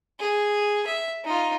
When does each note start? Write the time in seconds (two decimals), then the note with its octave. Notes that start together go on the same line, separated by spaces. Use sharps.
0.19 G#4
0.87 E5
1.24 D#4 F4